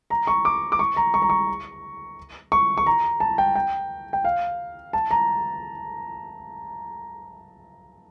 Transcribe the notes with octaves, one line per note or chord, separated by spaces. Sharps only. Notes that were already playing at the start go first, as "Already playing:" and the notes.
A#5
C#6
D6
D6
C#6
A#5
C#6
A#5
C#6
C#6
C#6
A#5
A5
G5
G5
G5
F5
A5
A#5